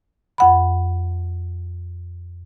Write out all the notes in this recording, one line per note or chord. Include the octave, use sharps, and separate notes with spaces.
F2 F#5 B5